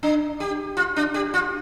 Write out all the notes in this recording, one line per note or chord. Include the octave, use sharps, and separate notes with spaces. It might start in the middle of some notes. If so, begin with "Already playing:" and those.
D4
G4
F4
D4
G4
F4